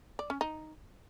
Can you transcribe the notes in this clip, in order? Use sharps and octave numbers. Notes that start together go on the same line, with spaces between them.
D5
C#4
D#4